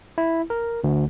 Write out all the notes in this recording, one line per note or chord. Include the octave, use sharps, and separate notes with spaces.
E4
A#4
D2